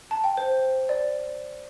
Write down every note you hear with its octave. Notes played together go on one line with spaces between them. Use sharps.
A5
G5
C5
D5